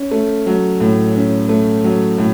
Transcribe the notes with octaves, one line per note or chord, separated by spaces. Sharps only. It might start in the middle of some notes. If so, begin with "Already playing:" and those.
Already playing: C#4
A3
F#3
A2
C#4
A3
F#3
A2